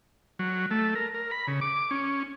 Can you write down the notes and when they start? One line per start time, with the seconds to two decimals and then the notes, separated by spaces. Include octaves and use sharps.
0.39 F#3
0.71 A3
0.95 A#4
1.14 A#4
1.31 B5
1.47 C#3
1.61 D6
1.91 C#4